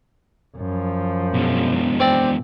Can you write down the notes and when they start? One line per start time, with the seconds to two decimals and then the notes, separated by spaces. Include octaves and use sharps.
0.57 F#2 F3
1.34 B2 G#3
2.00 C4 D5